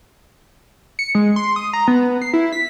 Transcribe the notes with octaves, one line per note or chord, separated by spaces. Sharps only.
C#7
G#3
C6
D#6
A#5
B3
C7
E4
B6